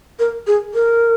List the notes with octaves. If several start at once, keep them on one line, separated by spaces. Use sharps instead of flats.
A#4
G#4
A#4